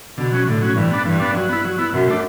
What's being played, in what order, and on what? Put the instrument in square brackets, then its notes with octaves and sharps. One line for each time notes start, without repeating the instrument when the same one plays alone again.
[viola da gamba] B2 [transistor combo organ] D3
[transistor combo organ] F#3 C#4
[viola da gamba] A2 [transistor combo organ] D3
[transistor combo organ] F#3 C#4
[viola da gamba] G2 [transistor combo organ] E3
[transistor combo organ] B3 D4
[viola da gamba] G2 [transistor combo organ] E3
[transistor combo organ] B3 D4
F#3
B3 E4
F#3
B3 E4
[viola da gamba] F#2 [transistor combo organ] B2
[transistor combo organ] A3 D4